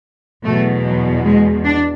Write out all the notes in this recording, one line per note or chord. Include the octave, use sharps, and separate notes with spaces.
E2 B2 F#3 A3
F#3
G#3
D4